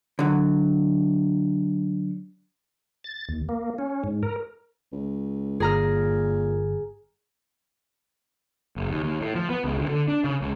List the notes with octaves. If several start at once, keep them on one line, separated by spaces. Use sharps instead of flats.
D3 F#3
A6
D#2
A#3
C#4
G#2
A#4
C#2
G1 A#2 G#4 A#5 F6
F#1
D#2
D#2
A2
F3
B3
C#2
D2
D3
D4
C#3
C#2